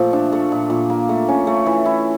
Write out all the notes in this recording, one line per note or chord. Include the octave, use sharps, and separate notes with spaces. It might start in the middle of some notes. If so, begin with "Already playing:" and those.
Already playing: A#2 F3 A3
D4
A3
A#2
A#2
A#3
A3
C#4
A3
E3
E4